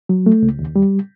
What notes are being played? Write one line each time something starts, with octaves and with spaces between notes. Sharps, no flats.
F#3
A3
C#2
D#2
G3